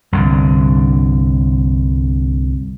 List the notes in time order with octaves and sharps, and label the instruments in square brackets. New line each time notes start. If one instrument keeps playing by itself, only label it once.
[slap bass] C2 G2 D3